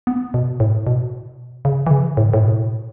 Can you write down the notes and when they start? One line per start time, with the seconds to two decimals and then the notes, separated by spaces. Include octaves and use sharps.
0.07 B3
0.34 B2
0.60 A2
0.87 B2
1.65 C#3
1.87 E3
1.91 C#3
2.17 A2
2.34 A2
2.44 B2